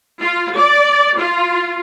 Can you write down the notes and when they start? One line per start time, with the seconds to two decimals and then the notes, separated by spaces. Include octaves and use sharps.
0.20 F4
0.56 D5
1.18 F4